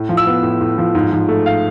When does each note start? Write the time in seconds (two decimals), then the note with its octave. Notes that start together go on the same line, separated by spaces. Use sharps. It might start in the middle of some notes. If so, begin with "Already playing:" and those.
Already playing: A2
0.09 F3
0.17 E6
0.27 B3
0.43 A2
0.61 A2
0.78 F3
0.95 G#2
1.12 F3
1.29 A3
1.46 F5